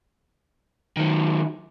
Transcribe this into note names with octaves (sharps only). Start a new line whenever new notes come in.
D#3 F#3